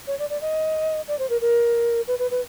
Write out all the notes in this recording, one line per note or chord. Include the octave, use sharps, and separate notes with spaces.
C#5
D5
D5
D#5
D5
C5
A#4
A#4
B4
B4
B4